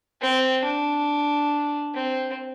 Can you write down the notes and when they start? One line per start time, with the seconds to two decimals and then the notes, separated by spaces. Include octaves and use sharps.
0.21 C4
0.64 D4
1.94 C4